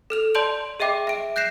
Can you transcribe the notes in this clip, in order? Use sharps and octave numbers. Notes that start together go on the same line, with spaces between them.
A4 F6 F7
D5 A5 C6 G6 D7 F#7
G#4 D#5 E5 G5 D6
E5 D7
F#6 G6 A#6 C7 E7